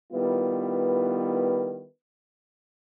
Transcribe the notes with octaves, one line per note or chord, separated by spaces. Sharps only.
D#3 G3 B3 E4 F4 B4